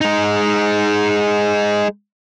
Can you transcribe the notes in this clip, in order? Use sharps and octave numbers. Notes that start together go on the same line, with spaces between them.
G#3 D#4